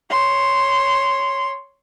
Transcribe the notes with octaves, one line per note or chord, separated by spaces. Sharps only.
C#5 C6